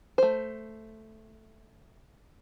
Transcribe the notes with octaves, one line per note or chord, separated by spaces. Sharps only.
A3 C5